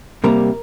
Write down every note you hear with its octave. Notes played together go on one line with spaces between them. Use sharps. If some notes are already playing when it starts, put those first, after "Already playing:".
C3 G3 A#3 A#4